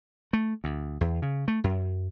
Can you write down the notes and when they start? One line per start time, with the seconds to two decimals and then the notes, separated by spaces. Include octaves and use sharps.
0.33 A3
0.64 D2
1.01 E2
1.22 C#3
1.48 A3
1.64 F#2